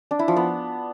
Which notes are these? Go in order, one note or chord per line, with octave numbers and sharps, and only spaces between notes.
D4
E4
F3
B3